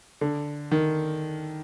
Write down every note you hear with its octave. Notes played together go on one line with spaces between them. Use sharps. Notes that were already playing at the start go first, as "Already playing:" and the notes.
D3
D#3